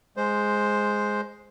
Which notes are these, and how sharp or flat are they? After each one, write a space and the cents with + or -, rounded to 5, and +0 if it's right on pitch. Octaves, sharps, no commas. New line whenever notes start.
G#3 +0 C5 +0